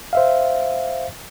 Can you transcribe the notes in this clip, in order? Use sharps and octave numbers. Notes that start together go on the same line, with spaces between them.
C5 E5 F5